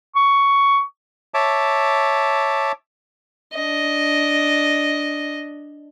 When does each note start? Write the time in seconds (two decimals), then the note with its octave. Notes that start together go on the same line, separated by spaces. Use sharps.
0.15 C#6
1.34 C#5 E5 A5 D6
3.54 D4 D#5